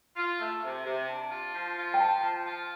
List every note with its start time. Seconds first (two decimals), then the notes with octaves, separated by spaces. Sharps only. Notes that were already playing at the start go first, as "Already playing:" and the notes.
0.16 F4
0.38 A3
0.63 C3
0.85 C3
1.08 D4
1.31 F4
1.53 F3
1.77 F4
1.94 G5
1.99 F3 A5
2.23 F3
2.45 F4